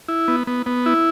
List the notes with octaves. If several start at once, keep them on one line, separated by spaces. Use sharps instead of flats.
E4
B3
B3
B3
E4